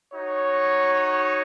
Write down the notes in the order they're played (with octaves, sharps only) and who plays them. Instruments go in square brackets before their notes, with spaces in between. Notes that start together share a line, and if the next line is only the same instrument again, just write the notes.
[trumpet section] D#4 F#4 C#5